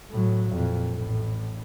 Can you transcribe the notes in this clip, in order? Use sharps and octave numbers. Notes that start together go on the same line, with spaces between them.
A2 F#3
F2 A#2
A1 A2